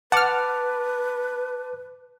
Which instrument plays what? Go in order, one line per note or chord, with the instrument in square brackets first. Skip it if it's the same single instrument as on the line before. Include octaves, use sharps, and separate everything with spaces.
[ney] B4 [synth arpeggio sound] F#5 F6 [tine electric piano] A5 D6